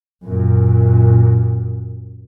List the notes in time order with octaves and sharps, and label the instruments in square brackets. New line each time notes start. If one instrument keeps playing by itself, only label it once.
[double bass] F#2 A#2